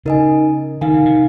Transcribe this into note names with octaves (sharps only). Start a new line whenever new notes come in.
C#3 D#4 A#4 D#5 G#5
D#3 D#4 A#4 F5 G#5
C#3
C3